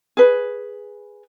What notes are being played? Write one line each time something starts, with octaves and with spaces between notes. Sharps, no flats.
G#4 B4